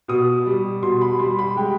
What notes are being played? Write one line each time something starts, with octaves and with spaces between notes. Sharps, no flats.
B2 D#6
G3
B2 C6
B5
G3 C6
B5
G#3 G5